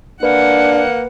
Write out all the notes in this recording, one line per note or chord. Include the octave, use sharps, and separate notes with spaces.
A#3 D4 B4 F#5